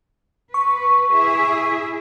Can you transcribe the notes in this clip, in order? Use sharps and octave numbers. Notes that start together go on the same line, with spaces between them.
B4 C#6
E4 G#4 E5